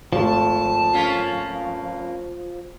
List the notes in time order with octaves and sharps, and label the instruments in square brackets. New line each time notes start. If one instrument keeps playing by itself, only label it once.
[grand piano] G#1 A3 [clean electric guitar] F3 [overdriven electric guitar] A5
[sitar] A#3 C#4 F4